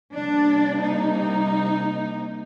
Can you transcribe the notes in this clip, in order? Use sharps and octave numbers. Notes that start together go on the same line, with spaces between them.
C3 G3 A#3 D4
D#4